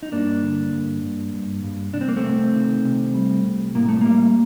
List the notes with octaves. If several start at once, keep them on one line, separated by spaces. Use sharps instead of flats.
D#4
G2 A#3 D4
D3
G2
G2
G2
G2
C2 D4
C4
A#3
A3 C4
C3
D#3
C3
G3
C2
A2 A#3
A3
G3 A#3